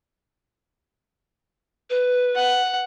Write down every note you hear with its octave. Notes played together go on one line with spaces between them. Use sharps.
B4
F#5